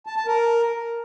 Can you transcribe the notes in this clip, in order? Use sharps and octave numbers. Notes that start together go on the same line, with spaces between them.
A5
A5
A#4